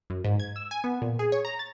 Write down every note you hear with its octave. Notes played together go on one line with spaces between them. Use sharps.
F#2
G#2
G#6
E6
G#5
B3
A#2
G#4
C#5
A#5
A6